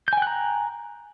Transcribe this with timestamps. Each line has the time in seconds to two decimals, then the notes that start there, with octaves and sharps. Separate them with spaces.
0.08 G6
0.13 G#5
0.17 G5
0.22 F#6
0.27 A#5